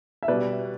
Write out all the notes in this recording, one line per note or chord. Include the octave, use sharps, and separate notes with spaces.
E5
B2 G3 B4 D5